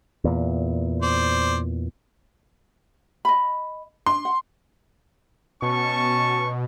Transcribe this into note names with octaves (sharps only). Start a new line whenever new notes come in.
E2 A#2
C5 D5
D#5 B5
D4 C6
F#5
B2 C#4 A5 C#6